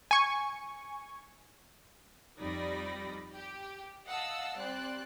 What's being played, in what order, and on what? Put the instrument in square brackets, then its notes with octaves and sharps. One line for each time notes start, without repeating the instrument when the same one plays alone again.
[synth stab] G#5 C#6
[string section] F2 G3 D#4 D5 B5 A#6
G4
D#5 F5 F#5 A5 E6
G3 C4 D5 C6 F#6